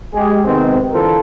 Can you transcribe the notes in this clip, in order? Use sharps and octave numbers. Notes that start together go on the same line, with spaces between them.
G#3 G4 G#4
C3 D#3 G#3 B3 C4
D3 E3 F4 A4 A#4 C5